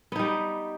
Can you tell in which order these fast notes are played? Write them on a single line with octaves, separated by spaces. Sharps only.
B3 D#4 G3